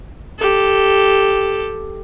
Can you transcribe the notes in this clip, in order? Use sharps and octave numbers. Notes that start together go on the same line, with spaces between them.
G4 A4